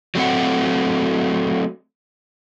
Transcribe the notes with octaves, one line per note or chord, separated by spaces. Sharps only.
F#3 A3 C4 F#4 F#5